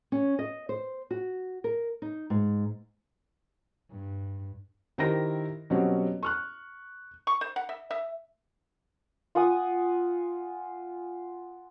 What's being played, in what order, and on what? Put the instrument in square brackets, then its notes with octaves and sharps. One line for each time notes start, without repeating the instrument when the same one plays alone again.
[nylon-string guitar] C#4
D#5
C5
F#4
A#4
D#4
G#2
[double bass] G2
[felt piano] D#3 E4 G4 A#4 C5 A#6
B2 F#3 G3 C4 C#4
C#6 F6 F#6
[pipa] C#6
C5
F#5
E5
E5
[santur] F4 F#5 G#5 D#6